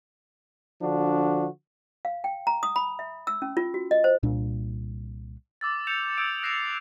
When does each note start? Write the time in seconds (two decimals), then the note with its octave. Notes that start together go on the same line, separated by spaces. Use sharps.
0.81 D3 F3 D4 F#4
2.05 F5
2.24 G5
2.47 A#5
2.63 D#6
2.76 B5
2.99 E5
3.27 E6
3.42 C#4
3.57 F4
3.74 F#4
3.91 D#5
4.04 C5
4.23 C2 A#2 D4
5.61 D6 E6 A6
5.87 G6 A6 C#7 E7 F7
6.18 D#6 E6 G6 G#6 C#7 D7
6.43 F#6 A#6 C7 D7 E7 F7